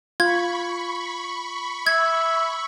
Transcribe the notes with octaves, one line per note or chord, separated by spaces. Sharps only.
F4 B5 C#6 G#6
E5 G#6